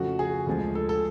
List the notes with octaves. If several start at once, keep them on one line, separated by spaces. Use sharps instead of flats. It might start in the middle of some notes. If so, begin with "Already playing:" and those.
Already playing: F2 C#3 F3 A3 F#4
G#4
D2 D3 F3 G#3
A4
A4